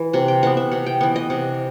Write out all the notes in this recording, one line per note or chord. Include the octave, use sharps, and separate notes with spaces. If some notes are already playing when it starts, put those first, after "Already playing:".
Already playing: E3
C3 F#5
G5
E3 B3 F#5
E5
C3 F#5
G5
E3 B3 F#5
D#5
C3 F#5